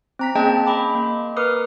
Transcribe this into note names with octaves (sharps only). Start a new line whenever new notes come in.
C4 A#5 B6
A#3 C#4 G#4 D#5 G5 A5
D#5 B5 D6
A#3
A#4 B4 D6 D#6 F6